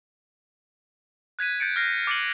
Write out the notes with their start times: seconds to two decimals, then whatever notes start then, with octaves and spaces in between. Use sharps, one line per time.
1.39 F#6 G#6 B6 D#7
1.60 G6 A6 C#7 D7
1.76 F6 G6 A#6 C7
2.07 D6 F6 A6 C#7 D#7 F#7